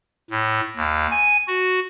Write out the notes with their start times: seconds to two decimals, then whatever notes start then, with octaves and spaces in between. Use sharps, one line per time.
0.31 A2
0.76 D#2
1.11 G#5
1.48 F#4